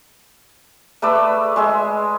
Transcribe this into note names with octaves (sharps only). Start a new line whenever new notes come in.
A3 B4 D5 E6
G#3 G#4 E5